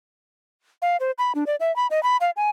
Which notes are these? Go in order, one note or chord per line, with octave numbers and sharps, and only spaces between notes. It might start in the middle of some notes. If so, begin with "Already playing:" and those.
F5
C5
B5
D4
D5
E5
B5
D#5
B5
F5
G#5